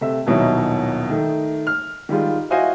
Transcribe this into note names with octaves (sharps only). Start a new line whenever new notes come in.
C3 A3 E5
D#1 B2 F#3 D#4 E4
D#3 A3
F6
D#3 G3 G#3 F4
E4 F#4 C5 D#5 F5 G#5